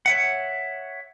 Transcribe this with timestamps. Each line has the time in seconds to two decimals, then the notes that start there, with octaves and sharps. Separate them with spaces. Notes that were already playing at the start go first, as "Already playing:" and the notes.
0.06 C#5 E5 F#5